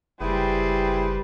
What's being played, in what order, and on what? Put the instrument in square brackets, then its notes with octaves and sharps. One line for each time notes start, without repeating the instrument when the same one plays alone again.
[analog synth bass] F#1 [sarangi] G3 [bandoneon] E4 G#4 [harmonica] B4 C5 G5